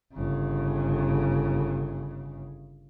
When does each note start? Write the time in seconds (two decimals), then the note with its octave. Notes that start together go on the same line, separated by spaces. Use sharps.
0.14 G1 C#3